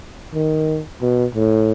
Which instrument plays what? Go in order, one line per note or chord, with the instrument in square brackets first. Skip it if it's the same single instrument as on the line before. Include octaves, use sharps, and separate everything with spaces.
[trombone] D#3
B2
A2